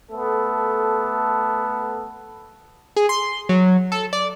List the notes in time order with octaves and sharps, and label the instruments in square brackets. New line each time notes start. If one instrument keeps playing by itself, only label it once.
[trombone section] A3 B3 A4
[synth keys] G#4
C6
F#3
A4
D5